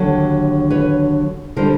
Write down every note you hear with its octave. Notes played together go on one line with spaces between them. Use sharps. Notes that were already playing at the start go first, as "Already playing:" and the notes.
Already playing: D#2 D3 F#3
B4 C#5
D3 G3 A#4 C5